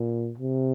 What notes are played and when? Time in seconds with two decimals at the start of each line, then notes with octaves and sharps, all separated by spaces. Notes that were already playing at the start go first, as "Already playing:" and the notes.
Already playing: A#2
0.38 C3